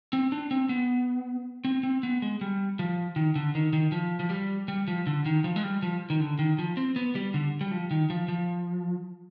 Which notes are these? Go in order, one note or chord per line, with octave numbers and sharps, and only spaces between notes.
C4
D4
C4
B3
C4
C4
B3
G#3
G3
F3
D#3
D3
D#3
D#3
F3
F3
G3
G3
F3
D3
D#3
F3
G#3
G3
F3
D#3
D3
D#3
F3
C4
B3
G3
D3
G3
F3
D#3
F3
F3